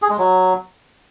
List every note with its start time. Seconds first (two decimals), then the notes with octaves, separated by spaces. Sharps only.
0.02 G#4
0.10 G#3
0.18 F#3